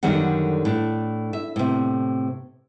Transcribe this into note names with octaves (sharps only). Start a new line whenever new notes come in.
F#2 D3 D#3 G3 A#4 F#5
A2 D4
E5
A2 C3